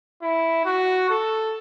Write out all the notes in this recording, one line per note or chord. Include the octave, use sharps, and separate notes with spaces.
E4
F#4
A4